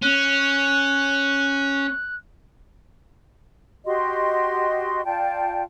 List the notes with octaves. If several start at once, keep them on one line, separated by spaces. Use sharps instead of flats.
C#4 F#6
F#4 G4 D#5 C6
F4 D5 G5 A5